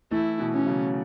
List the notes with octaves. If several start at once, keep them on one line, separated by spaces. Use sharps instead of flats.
E3 A3 E4
B2 E3
E3 C#4
C#3 F#3